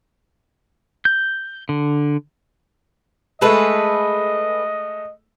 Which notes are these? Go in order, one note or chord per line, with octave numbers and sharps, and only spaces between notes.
G6
D3
G#3 A3 G#4 A4 B4 D#5